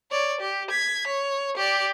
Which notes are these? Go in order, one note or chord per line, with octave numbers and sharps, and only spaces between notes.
C#5 D5
G4
G#6 B6
C#5
G4 D5